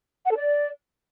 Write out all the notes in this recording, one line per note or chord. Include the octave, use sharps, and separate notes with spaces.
F#5
A4
D5